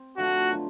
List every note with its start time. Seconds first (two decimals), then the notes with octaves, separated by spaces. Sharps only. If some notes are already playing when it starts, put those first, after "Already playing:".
Already playing: C4
0.17 D3 F3 A3 F#4
0.50 F#3 B3 D4 F4